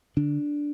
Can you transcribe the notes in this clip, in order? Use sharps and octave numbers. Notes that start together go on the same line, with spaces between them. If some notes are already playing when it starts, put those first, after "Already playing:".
D3 D4